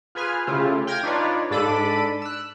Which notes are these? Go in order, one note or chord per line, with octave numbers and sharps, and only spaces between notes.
F4 G#4 B4 G#5 F6
C#3 A3 E4 F4 G4
G5 F6 G#6 A#6
D4 D#4 F4 B4 C#5 D5
G#2 D4 A4 B5 D6 D#7
E6 F#6